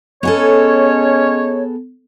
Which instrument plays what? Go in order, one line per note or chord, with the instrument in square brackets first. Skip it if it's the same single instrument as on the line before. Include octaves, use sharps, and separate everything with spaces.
[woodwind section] G#3 C#4 C#5 [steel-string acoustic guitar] B3 G#4 A4